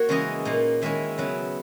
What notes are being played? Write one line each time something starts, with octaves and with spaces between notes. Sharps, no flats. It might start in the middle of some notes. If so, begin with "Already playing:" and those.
Already playing: A#3 F#4 C#5
C#3 E3 G#3 C#4 E4 D#5
A#2 A#3 D#4
D#3 G#3 C#4 E4 E5
C#3 F#3 B3 E4